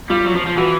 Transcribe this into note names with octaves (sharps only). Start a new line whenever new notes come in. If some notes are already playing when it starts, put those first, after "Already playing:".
G3 F4
F#3
F3
F3
E3 F#4